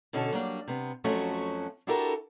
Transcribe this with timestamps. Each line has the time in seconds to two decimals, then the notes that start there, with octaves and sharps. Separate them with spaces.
0.13 B2 D3 C#4 F#4 G4 A4
0.33 F#3 G3 A#3 D4
0.68 C3 B3
1.04 F2 F3 F#3 A3 C#4 F#4
1.87 D4 E4 F#4 G4 A4 A#4